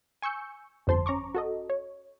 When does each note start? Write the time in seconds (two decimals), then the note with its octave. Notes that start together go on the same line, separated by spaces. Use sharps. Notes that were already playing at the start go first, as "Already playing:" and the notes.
0.22 G#5 C#6 E6 G6 C#7
0.87 G1 F2 C5 A5 C6
1.06 C#4 A#5 C#6 D6
1.35 F#4 A4 D#5
1.70 C#5